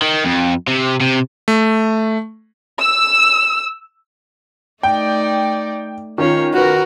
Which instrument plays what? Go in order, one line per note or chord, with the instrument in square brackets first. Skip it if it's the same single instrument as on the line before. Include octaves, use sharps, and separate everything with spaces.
[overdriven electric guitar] D#3
F2
C3
C3
[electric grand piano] A3
[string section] E6
[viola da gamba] A3 D#4 D5 [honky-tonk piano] G5
[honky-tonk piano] D#3 [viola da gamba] C#4 F4 C#5
[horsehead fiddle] F#4 [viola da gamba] A#4 B4